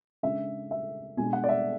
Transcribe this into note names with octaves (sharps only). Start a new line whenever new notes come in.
C#3 G#3 D4 E5
E5
B2 G#3 D4 G#5
F#5
D5
E5